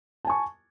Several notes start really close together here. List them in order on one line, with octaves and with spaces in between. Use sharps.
A5 G#5 C#6